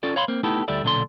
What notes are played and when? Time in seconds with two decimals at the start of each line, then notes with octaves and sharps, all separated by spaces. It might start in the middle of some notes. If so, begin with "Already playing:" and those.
0.03 C#4 F4 A4 D5
0.16 C#5 F5 B5 C6
0.28 A#3 C4
0.43 A3 B3 D#4 E4 G4 A4
0.68 D2 G3 E4 A4 D5
0.84 B1 A#2 D3 D4 A4 C6